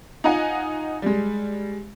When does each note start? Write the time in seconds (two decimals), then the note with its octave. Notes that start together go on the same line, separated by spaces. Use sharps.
0.24 D#4 F4 D#5 F#5 G#5
1.02 G3 G#3